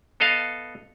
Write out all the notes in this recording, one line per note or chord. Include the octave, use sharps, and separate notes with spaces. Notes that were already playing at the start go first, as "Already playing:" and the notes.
B3 A4 D#5 F5